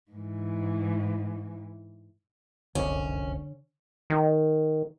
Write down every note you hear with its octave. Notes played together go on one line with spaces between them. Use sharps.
G#2 E3
F1 C2 F#2 D3 C#4 C#5
D#3